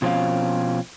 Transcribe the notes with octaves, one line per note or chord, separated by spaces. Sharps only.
B2 F3 C4 C#4 F5